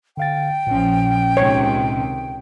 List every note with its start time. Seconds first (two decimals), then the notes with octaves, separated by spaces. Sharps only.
0.17 D3 F5 G5 A6
0.67 A#1 A#2 F3 C#4
1.37 C#2 C3 D#3 C#5